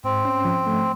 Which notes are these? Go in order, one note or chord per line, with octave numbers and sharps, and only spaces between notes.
G#2 C4
C#4
F3
A3